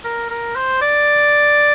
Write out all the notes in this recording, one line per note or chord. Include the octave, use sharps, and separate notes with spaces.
A#4
A#4
C5
D5